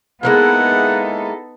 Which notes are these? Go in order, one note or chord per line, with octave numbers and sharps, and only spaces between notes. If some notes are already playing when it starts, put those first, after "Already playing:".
G#3 A#3 B3 D#4 E4 A4 F#5